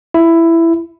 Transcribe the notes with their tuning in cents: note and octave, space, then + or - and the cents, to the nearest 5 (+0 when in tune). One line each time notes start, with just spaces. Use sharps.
E4 +10